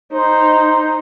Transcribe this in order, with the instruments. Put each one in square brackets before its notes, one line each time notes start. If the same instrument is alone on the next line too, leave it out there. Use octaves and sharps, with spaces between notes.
[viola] D#4 [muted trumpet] C5